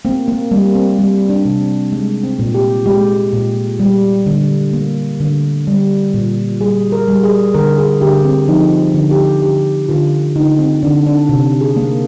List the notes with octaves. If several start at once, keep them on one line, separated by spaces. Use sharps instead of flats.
A#3 C4
A#3
G3 A#3
C4
G3
D4
C3
C4
G#3
C4
A#2
G4
G#3 G4
A#2
G3
D3
A#3
D3
G3
A#2
G3 G#4
A#4
G3
G#4
D3 A#4
G#4
D3 G4
C4
F3 D#4
D3
G4
D3 G4
D3 F4
D3 D#4
C4
D3 D4
D4
C3
G#4
A#3